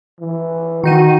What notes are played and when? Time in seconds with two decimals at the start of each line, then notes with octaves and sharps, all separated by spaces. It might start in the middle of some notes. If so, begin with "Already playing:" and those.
0.20 E3
0.84 D#3 D#4 F#4 D#7